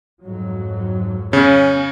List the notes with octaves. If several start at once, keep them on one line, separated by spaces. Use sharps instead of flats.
F2 G#2 F#3
C#3 C#4